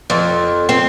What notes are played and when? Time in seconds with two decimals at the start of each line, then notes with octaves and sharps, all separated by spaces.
0.10 F2
0.69 C4